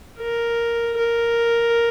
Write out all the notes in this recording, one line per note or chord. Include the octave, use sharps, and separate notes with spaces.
A#4
A#4